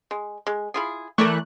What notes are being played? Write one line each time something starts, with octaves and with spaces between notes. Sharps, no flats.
G#3
G#3
E4 F4 G#4
E3 A3 A#4 D5 C#6 F#6